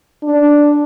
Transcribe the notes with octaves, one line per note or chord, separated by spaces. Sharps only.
D4